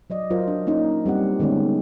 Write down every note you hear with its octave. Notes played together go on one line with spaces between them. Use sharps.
F#3 D5 D#5
F#3 F4 A#4 C5
D4
A#3 C#4 D#4
G3 C4 G4 F#5
D3 D#3 G#3 B3 C#4